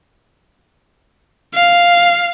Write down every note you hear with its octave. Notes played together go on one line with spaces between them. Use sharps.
F5